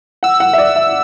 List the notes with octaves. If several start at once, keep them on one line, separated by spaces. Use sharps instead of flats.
F#5 E6
F#5
E5
D5
E5